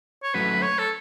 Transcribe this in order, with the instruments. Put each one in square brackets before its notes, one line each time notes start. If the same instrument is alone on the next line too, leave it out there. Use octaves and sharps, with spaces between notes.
[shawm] C#5
[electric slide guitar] F#3 A3 C#4 F#4 [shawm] B4
[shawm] C#5
A4